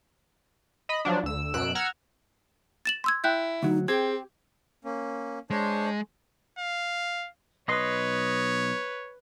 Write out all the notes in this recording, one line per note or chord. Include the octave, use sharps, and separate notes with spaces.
D#5 B5
F3 F#3 D4
D2 E6
F#2 B2 E6 F#6 D7
F#5 A#5 E6 F6 G#6
A6 E7 F#7
C6 E6 G#6
E4 G5 F#6 G6
D2 F#3 D#4
C4 G4 G#4 G#6
A#3 C#4
G#3 D4 C5 C#5
F5
B1 B4 C#5 D#5 C6